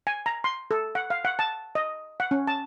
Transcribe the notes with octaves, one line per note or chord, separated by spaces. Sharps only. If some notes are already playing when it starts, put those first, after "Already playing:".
G#5
A#5
C6
A4
F#5
F5
F#5
A5
D#5
F#5
C#4
A5